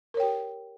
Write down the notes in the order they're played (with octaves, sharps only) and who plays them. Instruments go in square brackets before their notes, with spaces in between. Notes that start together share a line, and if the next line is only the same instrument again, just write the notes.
[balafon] A#4
C#5
G5
G4